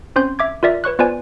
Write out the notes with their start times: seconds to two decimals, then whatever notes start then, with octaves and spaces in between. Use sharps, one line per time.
0.16 C4 C#4 C5 C6 G6
0.39 E5 D6 G#6
0.63 F4 A#4 D5 E5
0.84 B4 C#5 C#6 F#6
0.99 B3 F4 B4 C5 D5 G#5